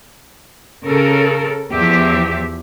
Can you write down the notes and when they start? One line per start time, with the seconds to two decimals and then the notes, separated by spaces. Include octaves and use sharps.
0.85 C#3 A4 A#4
1.72 E2 F3 G4 E5